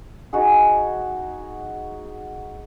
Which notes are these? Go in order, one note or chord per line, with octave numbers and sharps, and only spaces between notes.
D#4 F#4 G#4